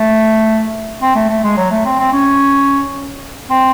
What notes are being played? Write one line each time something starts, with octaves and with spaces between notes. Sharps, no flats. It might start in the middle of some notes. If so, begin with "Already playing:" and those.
Already playing: A3
C4
A3
A3
G#3
F#3
A3
C4
C4
C#4
C4